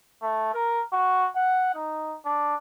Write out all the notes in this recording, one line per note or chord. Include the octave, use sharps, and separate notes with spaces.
A3
A#4
F#4
F#5
D#4
D4